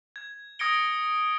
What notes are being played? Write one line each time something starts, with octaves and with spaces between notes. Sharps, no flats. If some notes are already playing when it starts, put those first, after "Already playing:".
G#6
D#6 G#6 A#6 C#7 D7 G7